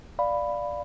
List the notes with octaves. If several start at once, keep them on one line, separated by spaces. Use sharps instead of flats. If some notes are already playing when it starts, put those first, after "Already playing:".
D5 F5 B5